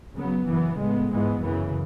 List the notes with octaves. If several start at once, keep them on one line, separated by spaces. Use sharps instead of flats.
C#3 F#3 B3
F#2 C#3 E3 B3
A2 G#3 B3
G#2 E3 G#3 B3
F#2 C#3 E3